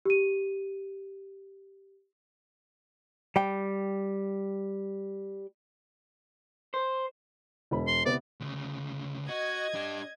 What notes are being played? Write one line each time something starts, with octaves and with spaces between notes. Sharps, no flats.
G4 D#7
G3 G5
C5
E1 B5
C6
C3 B3 D5
D2 C#3
F#4 D#5 G#6
D4 G4